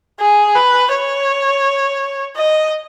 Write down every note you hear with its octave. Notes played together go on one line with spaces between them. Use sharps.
G#4
B4
C#5
D#5